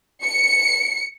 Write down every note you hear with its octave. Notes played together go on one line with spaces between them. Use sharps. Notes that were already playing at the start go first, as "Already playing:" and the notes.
C#7